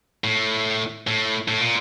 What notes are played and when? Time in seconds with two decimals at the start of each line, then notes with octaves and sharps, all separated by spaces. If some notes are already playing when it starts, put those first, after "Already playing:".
0.24 A2
1.07 A2
1.48 A2
1.61 A#2